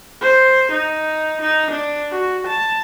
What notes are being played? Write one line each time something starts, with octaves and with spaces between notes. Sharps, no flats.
C5
D#4
D#4
D4
F#4
A5